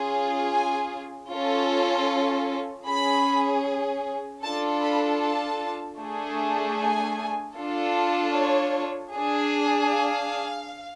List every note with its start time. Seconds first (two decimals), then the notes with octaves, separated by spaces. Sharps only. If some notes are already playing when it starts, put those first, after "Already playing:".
Already playing: C#4 F4 G#4
0.52 G#5
1.31 C#4 F4 A4
2.86 C#4 G#4 B5
4.43 D4 F4 A4 A5
4.83 B5
5.22 A5
6.00 A3 D4 G#4
6.78 G#5
7.57 D4 F4 A4
8.35 C#5
9.14 D4 G#4
9.91 F5